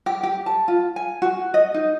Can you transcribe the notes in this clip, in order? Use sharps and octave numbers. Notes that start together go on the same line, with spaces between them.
G4
G4
A5
F4
G#5
F#4
D#5
D#4